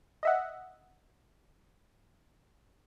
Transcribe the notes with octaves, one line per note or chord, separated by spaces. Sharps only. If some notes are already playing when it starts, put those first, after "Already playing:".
D#5 E5 F#5